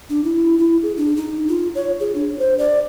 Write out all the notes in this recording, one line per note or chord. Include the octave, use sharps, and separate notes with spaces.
D4
E4
E4
G#4
D4
D#4
F4
C#5
G#4
D4
C5
D5